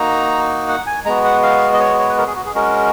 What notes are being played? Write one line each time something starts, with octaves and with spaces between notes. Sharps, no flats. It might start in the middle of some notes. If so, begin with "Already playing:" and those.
Already playing: A#3 D#4 F#4 A#5
F#5
G#5
G#3 B3 F#4 A#5
F#5
F5
D#5
C#5
C#5
B4
A#4
G#4
F#4
G#4
G#3 C#4 F#4 A#4